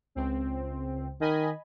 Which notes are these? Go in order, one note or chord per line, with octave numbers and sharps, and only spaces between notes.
C#2 C4
D#3 D#5 G#5 B5